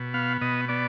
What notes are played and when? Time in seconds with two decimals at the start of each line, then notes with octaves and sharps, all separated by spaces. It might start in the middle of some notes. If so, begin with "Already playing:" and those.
Already playing: B2
0.14 B3 F5
0.41 B2 D#5
0.69 B3 D5